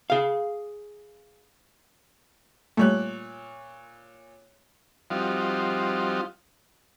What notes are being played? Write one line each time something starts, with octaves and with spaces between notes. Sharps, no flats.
G#4 F5
A#2 G3 A3 C#5 F#6
F3 G3 C4 D#4 F4 F#4